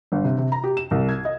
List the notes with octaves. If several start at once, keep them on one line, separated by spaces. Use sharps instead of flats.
G1
C3
C3
A#5
G4
E7
C2
G#6
D#5